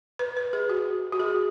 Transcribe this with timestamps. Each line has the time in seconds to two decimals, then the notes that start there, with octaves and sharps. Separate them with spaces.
0.19 B4
0.37 B4
0.53 G#4
0.70 F#4
1.13 F#4
1.20 G#4